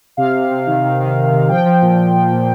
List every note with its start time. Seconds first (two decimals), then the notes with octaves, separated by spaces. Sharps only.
0.17 C3 F5
0.34 C3
0.50 C3
0.67 D#3
0.83 D#3
1.00 D#3
1.17 C3
1.32 C3
1.49 F3 G5
1.66 F3
1.82 A#2
1.99 A#2
2.15 F3
2.32 A#2